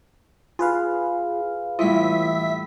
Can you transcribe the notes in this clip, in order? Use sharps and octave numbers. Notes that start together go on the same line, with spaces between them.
F4 G#4 B4 F5
A2 E3 G3 F4 D#5 E5 B6